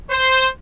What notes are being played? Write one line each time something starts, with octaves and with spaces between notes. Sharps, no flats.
C5